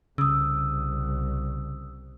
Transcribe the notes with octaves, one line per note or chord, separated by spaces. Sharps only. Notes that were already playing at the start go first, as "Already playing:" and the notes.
C2 C#3 D#6 E6